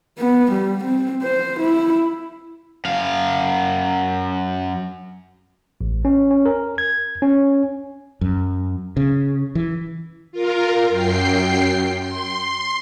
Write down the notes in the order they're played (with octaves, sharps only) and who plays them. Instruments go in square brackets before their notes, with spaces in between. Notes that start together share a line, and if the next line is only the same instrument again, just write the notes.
[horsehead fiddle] B3
G3
C4
C5
E4
[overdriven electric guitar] F#2 F5
[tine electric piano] A1
C#4
C#4
A#4
G#6
C#4
[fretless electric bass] F#2
C#3
E3
[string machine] F4 A#4
F#2 G5 C7
C6